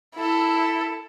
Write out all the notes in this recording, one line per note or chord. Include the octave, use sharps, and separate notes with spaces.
E4 A4